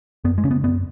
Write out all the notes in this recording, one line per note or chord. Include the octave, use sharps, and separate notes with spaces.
F#2 B3
G#3
C#3 C#4
B3
F#2 B3